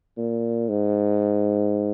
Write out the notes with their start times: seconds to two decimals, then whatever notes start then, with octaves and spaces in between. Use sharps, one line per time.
0.17 A#2
0.69 G#2